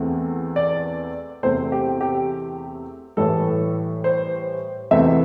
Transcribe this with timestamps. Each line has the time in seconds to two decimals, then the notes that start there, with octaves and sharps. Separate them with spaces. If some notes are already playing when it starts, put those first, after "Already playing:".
Already playing: E2 E3 A3 C4
0.56 D5
1.43 E2 C3 A3 C4 C5
1.72 G4
2.01 G4
3.17 A2 E3 G3 A4
4.04 C5
4.91 E2 C3 E3 A3 C4 E5